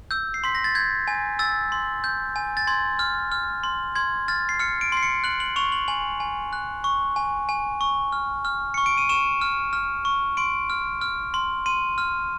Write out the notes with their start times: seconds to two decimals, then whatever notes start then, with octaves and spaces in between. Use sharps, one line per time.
0.11 E6 G6
0.34 C7
0.44 C6 B6
0.55 A#6
0.64 A6
0.75 G6 G#6
1.07 G#5
1.39 E6 A6
1.72 C6
2.04 G6
2.36 G#5
2.57 A6
2.67 C6 G#6
2.99 F6
3.32 F6
3.64 C6
3.95 C6 G#6
4.28 F6 A6
4.49 C7
4.60 F6 C#7
4.81 D7
4.92 C6 C7
5.03 C#7
5.24 F#6 F#7
5.40 F#7
5.56 C#6 F7
5.72 F#7
5.88 G#5 F#7
6.20 G#5
6.53 F#6
6.84 C#6
7.16 G#5
7.49 G#5
7.81 C#6
8.12 F6
8.45 F6
8.74 C#6 C#7
8.86 D7
8.98 D#7
9.09 C#6 E7
9.41 F6
9.73 F6
10.05 C#6
10.37 C6 D7
10.70 F6
11.01 F6
11.34 C6
11.66 C6 D#7
11.98 F6